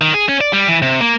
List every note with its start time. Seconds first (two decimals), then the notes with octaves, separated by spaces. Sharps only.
0.01 D#3
0.14 G#4
0.29 C#4
0.41 D5
0.53 G3
0.68 E3
0.82 C3
1.01 A#3